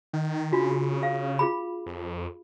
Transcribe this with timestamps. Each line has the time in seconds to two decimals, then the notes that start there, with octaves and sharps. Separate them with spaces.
0.13 D#3
0.52 C#3 D4 F4 F#4
1.03 F5
1.39 F4 G#4 B5
1.86 F2